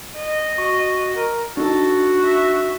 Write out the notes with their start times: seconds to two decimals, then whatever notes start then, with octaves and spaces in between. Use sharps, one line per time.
0.16 D#5
0.58 F#4 C#6
1.16 A#4
1.57 D4 D#4 F#4 A4
2.25 E5